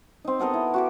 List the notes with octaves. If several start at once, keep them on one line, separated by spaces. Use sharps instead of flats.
C4 D#4
B3 A4 A#4 D#5
E4
F#4 G4 D6